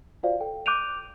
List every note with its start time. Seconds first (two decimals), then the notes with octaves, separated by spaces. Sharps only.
0.23 F4 F#4 C5 D5 F5
0.40 A4 G5
0.66 D6 F#6 G6 D7 D#7 F7